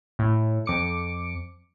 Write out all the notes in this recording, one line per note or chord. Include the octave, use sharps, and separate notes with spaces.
A2
F2 D6 C#7